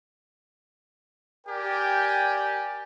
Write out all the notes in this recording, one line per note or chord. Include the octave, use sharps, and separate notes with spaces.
G4 A#4 D5 G5 G#5